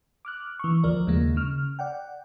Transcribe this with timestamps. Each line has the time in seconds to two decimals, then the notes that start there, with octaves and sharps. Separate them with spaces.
0.25 D6 F6 F#6
0.59 E3 C#6
0.83 D2 F3 A#4 D5
1.07 D#2 C#3 G#3 A#3
1.36 C#3 F6
1.79 D5 F#5 G5